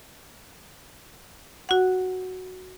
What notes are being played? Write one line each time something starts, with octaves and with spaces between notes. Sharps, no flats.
F#4 F#5